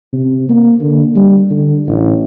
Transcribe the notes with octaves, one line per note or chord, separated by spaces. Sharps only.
C3
A#3
D3
G3
D3
A1